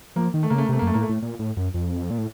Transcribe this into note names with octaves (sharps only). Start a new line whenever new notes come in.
F3 A#3
D#3
A3
C#3 A#3
A3
A#3
C3 A3
A#3
F#2
A3
A2 A#3
A3
A2
A#2
A2
F#2
F2
A#2
A2